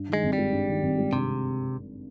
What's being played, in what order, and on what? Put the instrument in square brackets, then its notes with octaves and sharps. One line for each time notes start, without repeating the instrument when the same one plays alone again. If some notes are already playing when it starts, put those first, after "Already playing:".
Already playing: [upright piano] G2
D#3
[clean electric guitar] G#3
[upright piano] G#1
[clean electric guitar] G3
[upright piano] G#3
G2
D#3
G#1
G#3
[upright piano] G2 [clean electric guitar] C3